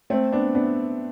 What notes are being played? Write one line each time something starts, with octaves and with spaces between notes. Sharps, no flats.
A3 C4
B3 D4
B3 D4